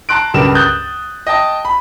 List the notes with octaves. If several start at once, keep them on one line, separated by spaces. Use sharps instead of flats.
A5 A#5 C6 F#6 D7
C#2 G2 A#4 B4 E7
D#6 F#6 G6 A6
D#5 G5 A5
B5